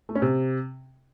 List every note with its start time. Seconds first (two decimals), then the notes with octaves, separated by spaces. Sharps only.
0.09 A3
0.15 C#4
0.22 C3